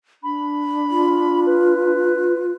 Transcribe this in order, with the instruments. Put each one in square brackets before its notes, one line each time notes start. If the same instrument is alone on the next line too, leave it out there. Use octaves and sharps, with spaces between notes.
[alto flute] D4 [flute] B5
[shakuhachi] F4
[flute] B4